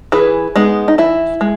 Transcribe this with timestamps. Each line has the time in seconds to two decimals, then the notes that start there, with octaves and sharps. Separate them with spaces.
0.12 E3 G#4 B4
0.56 G#3 B3 D#4
0.88 D#4
0.98 E3 E4
1.41 G#3